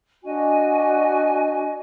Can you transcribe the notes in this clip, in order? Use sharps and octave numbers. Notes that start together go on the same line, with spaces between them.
D4 F#4 D#5 G#5